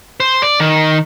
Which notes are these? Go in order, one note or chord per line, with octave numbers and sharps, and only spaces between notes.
C5
D5
D#3